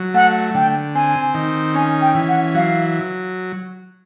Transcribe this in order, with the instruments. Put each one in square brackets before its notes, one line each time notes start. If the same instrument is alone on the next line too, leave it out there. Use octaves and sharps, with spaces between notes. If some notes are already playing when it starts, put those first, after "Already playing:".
Already playing: [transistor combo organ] F#3
[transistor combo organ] A3 [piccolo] F#5
[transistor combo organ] D3 [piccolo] G5
[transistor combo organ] C4 [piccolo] G#5
[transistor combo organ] D#3
[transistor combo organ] C#4 [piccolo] G#5
[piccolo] G5
[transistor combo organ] E3
[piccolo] F#5
[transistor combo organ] F#3 [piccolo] F5